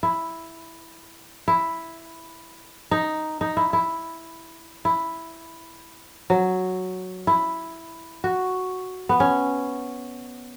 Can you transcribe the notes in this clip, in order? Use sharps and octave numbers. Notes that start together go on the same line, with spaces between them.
E4
E4
D#4
D#4
E4
E4
E4
F#3
E4
F#4
B3
C#4